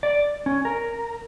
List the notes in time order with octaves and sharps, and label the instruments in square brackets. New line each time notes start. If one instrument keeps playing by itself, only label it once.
[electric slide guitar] D5
C#4
A#4